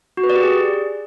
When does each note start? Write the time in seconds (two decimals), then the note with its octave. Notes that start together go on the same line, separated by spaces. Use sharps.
0.17 F#4
0.23 B4
0.30 D5
0.36 G4
0.42 G#4